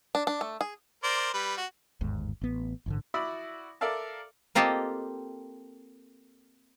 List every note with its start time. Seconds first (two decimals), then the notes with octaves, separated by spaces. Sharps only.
0.15 D4
0.27 D4
0.41 A3
0.61 G#4
1.03 A#4 C5 D5
1.34 G3 B4
1.57 F#4
2.01 G1 D#2 G#2
2.42 A1 B3
2.86 A1 G#2 D3
3.14 E4 F#4 D5 B5 D#6 E6
3.81 A4 A#4 D5 E5 F5 A5
4.55 A#3 C4 F4 G4 A4 D#5